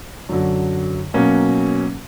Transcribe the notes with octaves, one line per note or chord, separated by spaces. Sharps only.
F#2 D3 F#3
B2 F#3 A#3 C#4